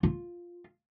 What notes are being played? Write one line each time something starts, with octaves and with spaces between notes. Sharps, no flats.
F4